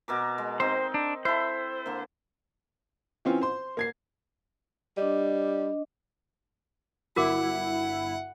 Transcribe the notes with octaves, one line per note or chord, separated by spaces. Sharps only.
B2 A#4 D6
G#3
C4 D#4 C5 G5
D4
E4 A4 C5
D3 A#3
E3 C4 C#4 F4
C5 C6
A#3 G#6 C7
G3 D4 D#5
G1 E4 F#4 A#4 F#5 D6